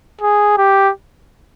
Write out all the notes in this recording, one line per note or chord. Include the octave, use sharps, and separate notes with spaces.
G#4
G4